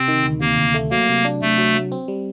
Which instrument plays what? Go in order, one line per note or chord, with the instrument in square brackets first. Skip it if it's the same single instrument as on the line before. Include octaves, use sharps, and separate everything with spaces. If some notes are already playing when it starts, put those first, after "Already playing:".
Already playing: [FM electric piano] C3 [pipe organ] C4
[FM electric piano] D#3
D2
[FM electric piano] C3 [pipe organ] A#3
[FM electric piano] D2
A3
[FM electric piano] F#3 [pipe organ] A#3
[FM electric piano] C3
D4
[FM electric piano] C3 [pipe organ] A3
[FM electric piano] F#3
F#3
C4
G3